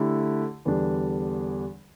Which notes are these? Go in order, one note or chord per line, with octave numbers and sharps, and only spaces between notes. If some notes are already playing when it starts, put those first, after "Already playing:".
Already playing: D3 A3 E4 G4
E2 D3 G3 D4